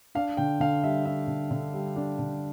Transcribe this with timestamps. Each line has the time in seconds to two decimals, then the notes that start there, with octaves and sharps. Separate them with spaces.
0.15 D4 F5
0.37 D3 G5
0.60 D3 F5
0.83 G3 E5
1.05 D4 E5
1.28 D3
1.51 D3
1.74 G3
1.96 D4
2.19 D3